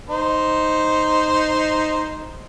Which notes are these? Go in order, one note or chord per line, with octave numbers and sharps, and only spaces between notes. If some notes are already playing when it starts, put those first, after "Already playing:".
D#4 C5